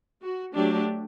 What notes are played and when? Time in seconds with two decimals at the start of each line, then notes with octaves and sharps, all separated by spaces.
0.21 F#4
0.53 F#3 A3 D4 G4